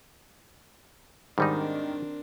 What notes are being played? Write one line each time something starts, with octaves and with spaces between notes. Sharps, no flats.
G#2 D#3 G3 C4 D4 D#4 A#4